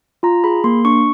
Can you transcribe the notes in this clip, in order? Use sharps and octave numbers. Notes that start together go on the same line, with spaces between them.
F4 A#5
G#4 B5
A#3 C6
D4 C#6